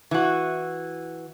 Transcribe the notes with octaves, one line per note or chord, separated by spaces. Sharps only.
E3 F#4